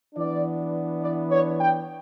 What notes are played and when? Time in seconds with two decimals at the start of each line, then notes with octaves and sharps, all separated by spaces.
0.15 E3 B3 D4 D5
1.01 D5
1.30 C#5
1.59 G5